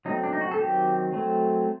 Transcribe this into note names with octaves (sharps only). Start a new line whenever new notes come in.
F#3 A3 C4 D#4
D4
D#4
F#4
A4
D#3 F#3 C4 G4
F#3 A3 C4